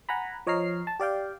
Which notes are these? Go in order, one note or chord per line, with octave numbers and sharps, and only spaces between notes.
F#5 G#5 A#5 B5
F3 C#5 D#5 A#5 F6 C7
A5
G4 D5 F5 G5